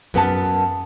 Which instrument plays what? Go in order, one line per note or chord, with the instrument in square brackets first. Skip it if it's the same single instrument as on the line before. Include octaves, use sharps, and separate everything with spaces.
[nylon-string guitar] F#2 B3 A5